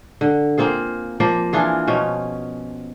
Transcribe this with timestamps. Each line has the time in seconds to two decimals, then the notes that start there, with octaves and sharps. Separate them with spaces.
0.21 D3
0.58 A#3 C4 F4 G#4
1.20 F3 A#3 D5
1.53 E3 D4 F4 G#4
1.88 B2 F3 C#4